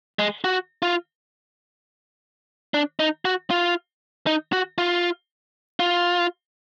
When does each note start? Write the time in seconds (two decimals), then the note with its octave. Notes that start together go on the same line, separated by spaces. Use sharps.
0.19 G#3
0.44 F#4
0.82 F4
2.74 D4
2.99 D#4
3.25 F#4
3.50 F4
4.27 D#4
4.53 F#4
4.78 F4
5.80 F4